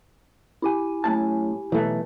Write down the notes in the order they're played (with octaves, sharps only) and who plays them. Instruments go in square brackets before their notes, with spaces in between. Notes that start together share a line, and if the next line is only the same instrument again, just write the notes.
[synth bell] E4 G4 G#5
[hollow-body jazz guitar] F#2 A2 A5
[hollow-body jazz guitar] B1 [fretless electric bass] E3 A3